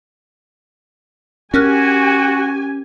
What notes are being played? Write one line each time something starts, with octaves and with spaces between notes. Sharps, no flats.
C#4 F#4 G4 A#4 G#5 F6 F#6